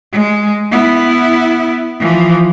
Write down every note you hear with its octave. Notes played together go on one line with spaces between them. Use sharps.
G#3
B3 E4
E3 F3